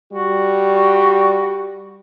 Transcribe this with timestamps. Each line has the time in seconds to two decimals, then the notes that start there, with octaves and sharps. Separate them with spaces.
0.13 G3 F#4